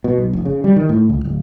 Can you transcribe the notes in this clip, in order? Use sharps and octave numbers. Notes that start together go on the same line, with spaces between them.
B2
B1
F1
C#3
G3
D#3
A2
C#2
D1